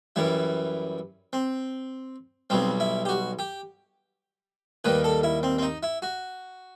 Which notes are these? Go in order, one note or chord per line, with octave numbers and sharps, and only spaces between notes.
F#2 E3 G3 E4
C4
B1 B2 G3 C4
E4
G4
F#4
G4
D#2 D#3 G3 B4
A4
E4
C4
C4
D#4
E4
F#4